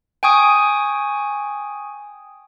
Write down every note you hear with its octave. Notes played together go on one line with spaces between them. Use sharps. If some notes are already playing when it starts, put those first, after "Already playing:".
G5 G#5 C#6 D#6